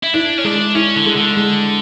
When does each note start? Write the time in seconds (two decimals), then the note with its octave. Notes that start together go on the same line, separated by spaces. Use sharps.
0.03 E4
0.14 D4 E4
0.38 C#4
0.44 G#3 D4
0.75 C#4 E4
0.96 D3
1.06 G#3
1.16 D3
1.37 G#3